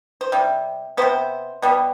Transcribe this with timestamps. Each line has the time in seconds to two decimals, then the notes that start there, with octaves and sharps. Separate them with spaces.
0.21 C5
0.32 C3 G3
0.97 G3 B3 C5
1.02 C3
1.62 B2 G3 B3